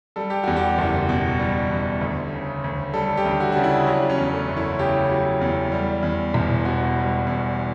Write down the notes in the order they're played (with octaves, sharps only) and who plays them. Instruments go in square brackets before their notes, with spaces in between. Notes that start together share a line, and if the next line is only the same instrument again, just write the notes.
[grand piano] G3 A4
G4
E2 F#4
G4
F#1
B2
G3
E2
D2
C#3
D2
G3 A4
G4
D2
F#4
C#3 D4
E4
F#3 D4
C#4
E2
A3
F#1
E4
C#3 G4
F#3
E2
G3
E2
E1
B2 F#4
G3
E2